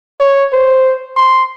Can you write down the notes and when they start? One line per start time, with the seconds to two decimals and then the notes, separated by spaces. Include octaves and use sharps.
0.20 C#5
0.53 C5
1.17 C6